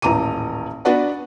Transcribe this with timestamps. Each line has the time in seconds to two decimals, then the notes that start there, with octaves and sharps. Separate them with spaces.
0.02 D#1 A1 A#5 D6 D#7
0.85 B3 D4 F#4 B4 D5 F#5